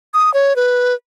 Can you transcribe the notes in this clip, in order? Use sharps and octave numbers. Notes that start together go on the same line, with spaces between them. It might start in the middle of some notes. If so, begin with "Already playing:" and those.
D#6
C#5
B4